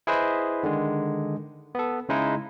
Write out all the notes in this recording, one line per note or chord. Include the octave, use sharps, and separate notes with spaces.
E4 G#4 B4 C5 D#5
D3 D#3 G#3
B3 A4
C#3 G#3 D#4 E4